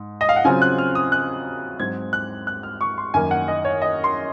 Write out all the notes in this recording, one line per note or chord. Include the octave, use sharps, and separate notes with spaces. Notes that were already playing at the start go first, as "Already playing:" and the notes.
Already playing: G#2
D#5
F5
F#5
C#3 F#3 C4 F4 G#5
F#6
F6
D#6
F#6
G#2 F#3 C4 G#6
F#6
F#6
F6
C#6
C6
F#2 D#3 A#3 G#5
F#5
D#5
C#5
D#5
C6